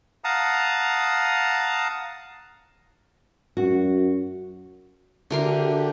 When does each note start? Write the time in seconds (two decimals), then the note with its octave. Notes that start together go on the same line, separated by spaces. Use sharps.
0.24 F5 F#5 A5 A#5 D#6
3.57 F#2 F#4
5.30 D3 D4 F#4 G4 A#4 E5 C6